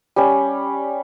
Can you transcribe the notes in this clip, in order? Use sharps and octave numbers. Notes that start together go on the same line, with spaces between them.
G3 C#4